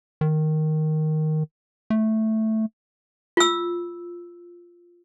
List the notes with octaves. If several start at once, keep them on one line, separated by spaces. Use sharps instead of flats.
D#3
A3
F4 E6